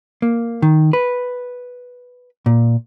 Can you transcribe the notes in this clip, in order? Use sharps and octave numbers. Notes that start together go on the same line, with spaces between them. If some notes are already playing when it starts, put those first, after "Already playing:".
A#3
D#3
B4
A#2